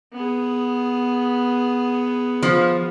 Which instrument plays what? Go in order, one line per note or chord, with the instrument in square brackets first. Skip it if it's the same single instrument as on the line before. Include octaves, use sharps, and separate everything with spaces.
[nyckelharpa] B3 G#4
[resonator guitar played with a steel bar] F3